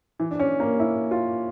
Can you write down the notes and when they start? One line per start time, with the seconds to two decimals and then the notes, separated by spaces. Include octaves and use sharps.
0.19 E3
0.31 D4
0.40 C#4
0.60 A#3
0.80 E4
1.11 F4